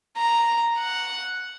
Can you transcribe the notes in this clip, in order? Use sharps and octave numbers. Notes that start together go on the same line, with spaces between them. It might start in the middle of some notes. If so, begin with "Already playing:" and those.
A#5
F#5